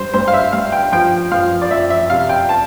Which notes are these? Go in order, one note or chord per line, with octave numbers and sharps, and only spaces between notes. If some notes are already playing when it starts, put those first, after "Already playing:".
Already playing: G2 C5
G2 C5
F5
E5
G2 F5
G5
F3 G5
F3 F5
D5
F3 E5
E5
C3 F5
G5
A5